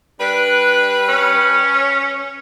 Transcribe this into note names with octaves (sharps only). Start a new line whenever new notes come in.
G3 D4 B4
C#4